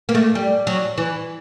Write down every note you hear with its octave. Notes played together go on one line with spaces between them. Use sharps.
A#3
A3
G3
F#3
E3